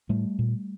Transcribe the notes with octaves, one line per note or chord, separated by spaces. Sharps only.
A2 G3 A3
A#2